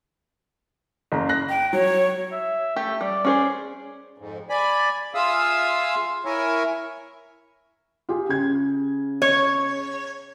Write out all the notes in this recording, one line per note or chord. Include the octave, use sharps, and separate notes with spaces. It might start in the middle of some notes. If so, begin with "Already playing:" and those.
F#1 A#5
F#6 A#6
G5
F#3 C#5
E5
A3 G4
G3 D5
C#4 G#4 C5
F2 G#2
D5 G#5 B5
F4 G#4 E5 F5 D#6 E6
E4 A#4 C#5 E5 G#5
F4 G4 G#4
C#3 G#6
C#5